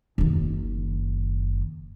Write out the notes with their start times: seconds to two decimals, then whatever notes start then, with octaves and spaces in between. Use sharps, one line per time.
0.18 F#1 D#3